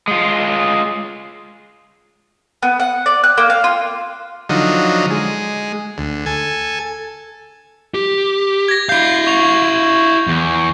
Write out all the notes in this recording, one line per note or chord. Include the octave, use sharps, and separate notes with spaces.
G#3 F4
B3
F#5
D5
F#6
A#3
F5
F4
D3 F3 F#3 D#4
G#3
D2
A4 G#5
G4
G#6 A#6
E4 F5 G6 C7
C#6 F7
E2